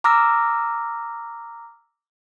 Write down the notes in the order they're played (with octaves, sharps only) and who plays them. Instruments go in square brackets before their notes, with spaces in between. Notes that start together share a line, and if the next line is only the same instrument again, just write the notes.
[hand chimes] A#5 D6 E6 F6 A#6